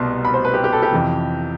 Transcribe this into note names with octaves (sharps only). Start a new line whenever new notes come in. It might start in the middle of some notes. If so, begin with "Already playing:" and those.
Already playing: C2 B2 B3 A5 C6
B5
C5
B4
G4
G4
A4
G4
F2 C3 E3